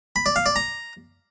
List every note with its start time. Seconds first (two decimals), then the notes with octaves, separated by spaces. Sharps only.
0.16 B5
0.26 D5
0.36 F5
0.46 D5
0.56 A#5